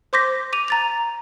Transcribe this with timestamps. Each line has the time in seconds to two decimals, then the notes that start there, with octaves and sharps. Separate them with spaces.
0.13 C5 C6 D6 G6 A#6 B6
0.53 D6 D#7 F7
0.68 A#5 A6 F7